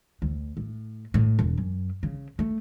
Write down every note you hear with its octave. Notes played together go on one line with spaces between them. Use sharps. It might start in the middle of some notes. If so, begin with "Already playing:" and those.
D2
A2
A2
E1
F#2
C#3
A3